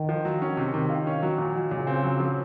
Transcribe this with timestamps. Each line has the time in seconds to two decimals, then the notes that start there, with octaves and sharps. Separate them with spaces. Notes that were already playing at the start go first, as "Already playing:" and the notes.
Already playing: D#3
0.09 F3
0.25 F#3
0.42 C#4
0.57 C3
0.74 C3 D#3
0.90 F4
1.07 C#4
1.23 F#3
1.38 A#2
1.56 F#3
1.71 A#2 C#3
1.87 C4
2.04 F#3
2.20 F3